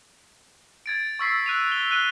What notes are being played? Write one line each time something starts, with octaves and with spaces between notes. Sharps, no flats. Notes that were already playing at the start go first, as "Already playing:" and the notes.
G#6 A6 D7
C#6 E6 B6 C7
F#6 D#7 F7
G7
F#6 D#7 G7